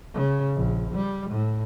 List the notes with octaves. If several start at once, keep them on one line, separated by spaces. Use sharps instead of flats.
C#3
A#1
G3
A2